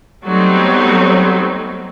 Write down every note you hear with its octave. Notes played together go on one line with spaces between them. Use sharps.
F#3 G3 A3 B3 C4 D#4